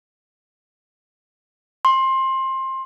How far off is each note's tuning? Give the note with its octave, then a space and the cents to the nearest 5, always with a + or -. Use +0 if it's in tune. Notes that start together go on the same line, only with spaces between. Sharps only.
C6 +20